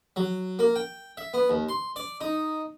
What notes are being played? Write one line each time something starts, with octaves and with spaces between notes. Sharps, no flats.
F#3
A#3
G5
E5
B3
D#2
C6
D5
D#4